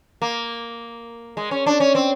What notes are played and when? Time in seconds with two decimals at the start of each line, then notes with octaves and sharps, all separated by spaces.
0.22 A#3
1.37 G#3
1.51 C#4
1.66 D4
1.80 C#4
1.95 C4